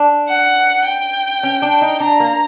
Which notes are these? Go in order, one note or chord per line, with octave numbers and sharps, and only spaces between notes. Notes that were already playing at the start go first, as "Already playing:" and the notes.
Already playing: D4
F#5
G5
C#4
D4
D#4
D4 A#5
A#3